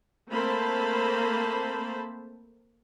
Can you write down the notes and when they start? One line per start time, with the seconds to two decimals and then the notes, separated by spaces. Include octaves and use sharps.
0.32 A3 A#3 C4 C5 A5 B5